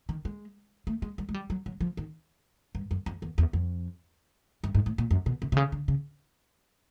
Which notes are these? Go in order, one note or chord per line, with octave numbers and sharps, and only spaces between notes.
D#3
G#3
A3
G#3
G3
G#3
G3
F#3
F#3
F3
D#3
G2
F#2
F2
E2
E2
F2
G2
G#2
A2
A#2
F#2
B2
C3
C3
C#3
D3
C#3